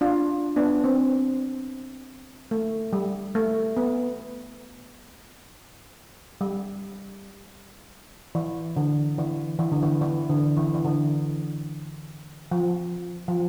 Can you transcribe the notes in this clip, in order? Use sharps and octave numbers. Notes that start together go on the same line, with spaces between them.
D4 F4
B3 D4
C4
A3
G3
A3
B3
G3
E3
D3
E3
E3
D3
E3
E3
D3
E3
E3
D3
F3
F3